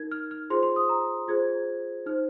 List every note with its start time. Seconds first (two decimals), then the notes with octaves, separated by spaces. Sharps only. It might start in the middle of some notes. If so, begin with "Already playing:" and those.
Already playing: D#4 A#4 G#6
0.11 F6
0.31 F6
0.50 F4 G#4 C5 C6
0.63 C6
0.76 D#6
0.89 A#5
1.28 F4 G#4 C5 G#6
2.06 D#4 C5 F6